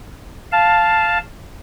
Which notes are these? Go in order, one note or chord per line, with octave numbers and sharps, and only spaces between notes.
F5 A5